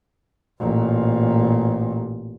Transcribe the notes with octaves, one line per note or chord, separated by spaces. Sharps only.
A1 A#2